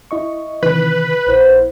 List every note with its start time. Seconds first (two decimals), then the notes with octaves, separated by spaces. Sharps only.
0.11 E4 D#5 C#6
0.63 C3 D#3 E3 B4
1.27 A#1 B3 E4 C5